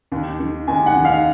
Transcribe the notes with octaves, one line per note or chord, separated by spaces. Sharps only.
D#2
D#3
D#2 G#5
F#5
D#3
F5